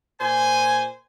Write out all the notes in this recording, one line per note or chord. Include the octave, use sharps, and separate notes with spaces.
A#2 C5 G#5